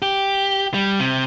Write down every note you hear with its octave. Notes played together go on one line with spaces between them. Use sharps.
G4
G3
C3